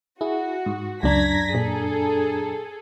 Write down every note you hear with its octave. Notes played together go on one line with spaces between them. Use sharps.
E4 F#4 G#4
G#2
C#2 F#2 D4 A#5 G#6 A#6 B6
A#2 G#4 A4